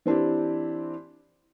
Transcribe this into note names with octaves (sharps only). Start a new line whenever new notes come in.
E3 C4 D4 E4 G4